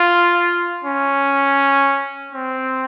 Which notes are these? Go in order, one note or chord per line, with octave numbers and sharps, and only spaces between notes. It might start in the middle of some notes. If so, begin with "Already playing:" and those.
Already playing: F4
C#4
C4